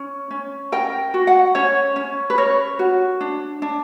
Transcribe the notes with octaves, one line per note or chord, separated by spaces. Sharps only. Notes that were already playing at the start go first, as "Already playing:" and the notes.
Already playing: C#4
C#4
A#4 G5
F#4
F#5
C#4 C#5
C#4
B4
A#4 C#5
F#4
D4
D4